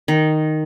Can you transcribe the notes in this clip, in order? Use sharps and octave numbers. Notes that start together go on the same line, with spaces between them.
D#3